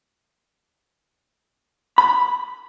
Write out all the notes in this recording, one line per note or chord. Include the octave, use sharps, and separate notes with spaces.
B5